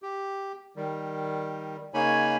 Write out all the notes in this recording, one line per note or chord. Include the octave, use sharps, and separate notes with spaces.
G4
D#3 G3
C#3 A#3 D#4 C#5 G#5 B5